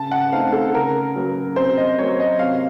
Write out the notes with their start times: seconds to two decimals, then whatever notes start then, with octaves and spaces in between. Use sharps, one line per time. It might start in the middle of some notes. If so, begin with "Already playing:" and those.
Already playing: C#3 A5
0.11 F#5
0.32 A3 C4 D#4 F5
0.53 A4
0.74 C#3 A#4
1.16 F#3 A#3
1.56 C3 C5
1.77 D#5
1.99 F#3 A#3 C#5
2.20 D#5
2.39 C3 F5